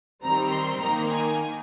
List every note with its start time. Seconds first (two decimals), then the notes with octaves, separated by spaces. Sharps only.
0.24 D#3 G3 C4 A#5
0.52 C6
0.80 D#3 A#3 D#4 A#5
1.09 G#5